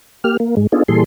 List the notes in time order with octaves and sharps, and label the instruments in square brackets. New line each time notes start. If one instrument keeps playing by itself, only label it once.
[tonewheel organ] A#3 G4 F6
A#3
G#2 G#3
B3 D4 D#4 F4 G#4 A4
A#2 E3 G3 G#4 A4 C6